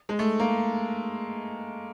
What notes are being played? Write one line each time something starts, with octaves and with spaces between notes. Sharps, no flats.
G#3
A3
A#3